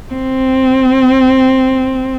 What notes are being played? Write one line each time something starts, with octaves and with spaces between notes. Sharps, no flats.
C4